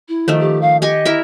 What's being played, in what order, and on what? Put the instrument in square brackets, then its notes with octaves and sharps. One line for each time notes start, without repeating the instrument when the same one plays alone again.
[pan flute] E4
[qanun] D#3 F3 A3
[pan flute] G4
F5
[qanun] G4 G#5 C#6 [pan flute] D#5
[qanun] E4 A#4 E5